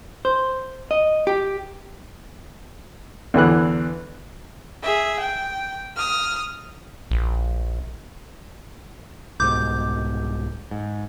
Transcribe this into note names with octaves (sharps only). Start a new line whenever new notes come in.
C5
D#5
G4
E2 D3 E3 F#6
G#4 E5
G5
D#6 F6
A#1
C2 G#2 B2 D6 G6
G#2